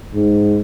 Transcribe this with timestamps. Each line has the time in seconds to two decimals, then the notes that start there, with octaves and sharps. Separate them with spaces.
0.14 G#2